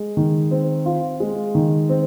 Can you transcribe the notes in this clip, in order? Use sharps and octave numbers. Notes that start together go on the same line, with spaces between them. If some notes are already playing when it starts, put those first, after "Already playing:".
Already playing: G#3
D#3
C4
F4
G#3
D#3
C4